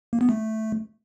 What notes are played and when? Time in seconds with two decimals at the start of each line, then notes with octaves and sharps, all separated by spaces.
0.13 A#3
0.21 B3
0.29 A3